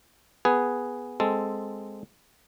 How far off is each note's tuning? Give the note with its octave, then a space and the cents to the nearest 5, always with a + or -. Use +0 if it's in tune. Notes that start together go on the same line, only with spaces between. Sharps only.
B3 +0 G#4 +0 B4 +0
G#3 +0 C4 +0 A4 +0